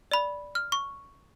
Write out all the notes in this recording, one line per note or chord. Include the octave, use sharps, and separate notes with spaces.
D5 B5
F6
C#6